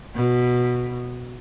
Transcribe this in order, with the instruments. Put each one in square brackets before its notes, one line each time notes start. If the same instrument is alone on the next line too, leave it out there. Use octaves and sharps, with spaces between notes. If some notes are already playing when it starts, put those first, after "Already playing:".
[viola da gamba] B2